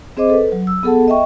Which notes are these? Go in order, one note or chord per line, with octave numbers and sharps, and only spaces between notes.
C4 G#4 C5 D#5 D6
A4 B4
F#3
E6
B3 G#4 A4 F#5 A5
D#5 E5 G5 C#6